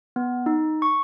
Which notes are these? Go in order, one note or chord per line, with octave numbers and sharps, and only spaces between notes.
B3
D#4
C#6